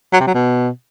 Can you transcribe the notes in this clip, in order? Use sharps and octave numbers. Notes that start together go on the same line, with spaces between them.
F#3
C3
F#3
B2